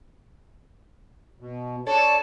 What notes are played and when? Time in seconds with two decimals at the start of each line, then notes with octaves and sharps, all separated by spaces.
1.40 B2
1.87 D4 A4 C#5 A5